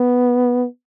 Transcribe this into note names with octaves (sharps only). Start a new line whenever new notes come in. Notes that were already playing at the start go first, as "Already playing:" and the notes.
Already playing: B3